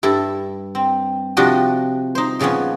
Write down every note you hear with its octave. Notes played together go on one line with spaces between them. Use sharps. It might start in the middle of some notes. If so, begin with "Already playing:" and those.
G2 E4 A4
C4
C3 F3 D4 F#4 G4 D#5
D#4 C5
A#2 C#3 F3 B3 C#4